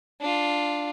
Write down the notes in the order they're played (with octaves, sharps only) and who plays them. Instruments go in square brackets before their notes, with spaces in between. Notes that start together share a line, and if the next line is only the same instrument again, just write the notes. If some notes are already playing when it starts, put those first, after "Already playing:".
[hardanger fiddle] D4 F4